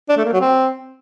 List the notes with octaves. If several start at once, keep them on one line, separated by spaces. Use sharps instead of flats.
D4
A3
A#3
F#3
C4